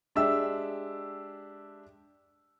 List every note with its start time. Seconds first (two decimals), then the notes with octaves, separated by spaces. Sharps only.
0.15 G#3 D4 G4 E5 E6